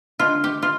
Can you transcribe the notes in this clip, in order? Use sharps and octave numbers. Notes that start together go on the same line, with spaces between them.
D3 G#3 F4
G4
F4